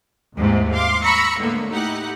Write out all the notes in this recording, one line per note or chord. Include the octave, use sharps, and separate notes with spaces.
D#2 G#2 C3 E3 A3
F5 C6 D6
A#5 B5 C#6 E6 A#6 C#7
A2 D3 G#3 A#3 B3
A3 D#4 E4 G4 F#5